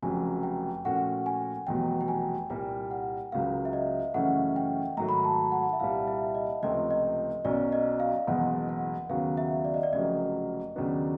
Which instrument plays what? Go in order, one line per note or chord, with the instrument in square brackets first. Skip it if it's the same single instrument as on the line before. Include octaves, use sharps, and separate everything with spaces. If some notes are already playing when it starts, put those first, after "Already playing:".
[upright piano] F1 F2 C#3 F#3 [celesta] G#5
[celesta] G5
[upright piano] A#2 F3 A3 C#4 F#4 [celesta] F#5
[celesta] G#5
[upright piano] F1 E2 B2 F#3 [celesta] G5
[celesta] G5
G#5
[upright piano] C2 A#2 G3 A#3 [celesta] G5
[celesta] F#5
[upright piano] C#2 C#3 F#3 A#3 [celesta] F5
[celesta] E5
D#5
[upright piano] F#2 C#3 E3 A3 C#4 [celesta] F#5
[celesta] G5
[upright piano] G#2 D#3 F#3 A3 [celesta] A#5
[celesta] B5
A#5
A5
F#5
E5
[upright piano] C2 A#2 G3 [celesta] F5
[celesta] E5
D#5
[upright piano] C#2 C3 F3 A3 C4 [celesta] D#5
[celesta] D#5
[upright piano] B1 B2 F#3 A#3 C#4 [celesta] D5
[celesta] D#5
F5
[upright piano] F#1 E2 B2 G#3 [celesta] F#5
[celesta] F#5
[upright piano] D#2 C#3 F#3 B3 [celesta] F5
[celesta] E5
D5
D#5
D5
[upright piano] F1 F2 C#3 F#3 A#3 [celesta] D#5
[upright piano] D#2 C#3 F#3 B3 D4